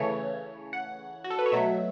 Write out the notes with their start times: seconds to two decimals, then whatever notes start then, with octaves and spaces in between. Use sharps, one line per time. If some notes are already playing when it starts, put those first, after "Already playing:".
Already playing: C#3 E3 A3 C#5
0.73 F#5
1.24 F#4
1.30 A4
1.39 B4
1.46 C#5
1.52 B2 F#3 A3 E5